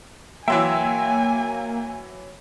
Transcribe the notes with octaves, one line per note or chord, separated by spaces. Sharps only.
E3 F#3 A#3 E5 G5 G#5 C6 E6